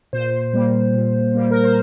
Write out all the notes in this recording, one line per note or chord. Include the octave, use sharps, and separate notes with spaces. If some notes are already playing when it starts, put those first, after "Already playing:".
A#2 C5
G3 A#3
A#2
G3 A#3
A#4
C5